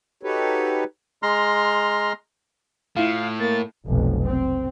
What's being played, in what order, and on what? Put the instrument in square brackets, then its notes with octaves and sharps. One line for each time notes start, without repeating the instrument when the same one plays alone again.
[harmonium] D#4 F#4 G4 A4 B4 C#5
[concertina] G#3 A#5 C6 F6
[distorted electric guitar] A2 [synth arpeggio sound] E4 F4 [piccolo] F5
[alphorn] A#3 [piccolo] A6
[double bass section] F1 B1
C4